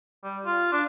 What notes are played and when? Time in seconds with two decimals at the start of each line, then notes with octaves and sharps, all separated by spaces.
0.24 G3
0.46 F4
0.72 D4